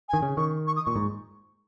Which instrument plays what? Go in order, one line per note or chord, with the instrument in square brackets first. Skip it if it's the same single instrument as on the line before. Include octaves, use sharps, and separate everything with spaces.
[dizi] G#5
[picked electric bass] D#3
C#3
[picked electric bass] D#3 [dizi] C#6
[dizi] C#6
D#6
[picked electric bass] A#2 [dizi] C#6
[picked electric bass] G#2